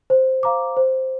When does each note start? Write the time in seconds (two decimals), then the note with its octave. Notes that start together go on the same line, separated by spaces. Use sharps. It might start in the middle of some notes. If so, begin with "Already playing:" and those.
0.10 C5
0.43 F5 A#5 D6
0.77 C5